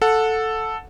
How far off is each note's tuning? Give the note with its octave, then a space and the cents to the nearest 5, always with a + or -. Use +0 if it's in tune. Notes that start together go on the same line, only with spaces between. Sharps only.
A4 +0 F#5 -20